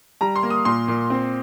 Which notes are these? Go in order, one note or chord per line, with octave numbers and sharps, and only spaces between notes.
G3 A#5
C6
A#3
D#6
A#2 C6
A#2
C4